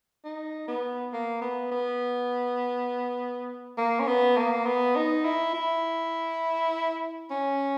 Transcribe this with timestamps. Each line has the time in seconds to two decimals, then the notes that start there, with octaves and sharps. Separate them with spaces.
0.25 D#4
0.68 B3
1.13 A#3
1.42 B3
1.71 B3
3.78 A#3
4.00 C#4
4.07 B3
4.37 A#3
4.66 B3
4.96 D#4
5.25 E4
5.54 E4
7.31 C#4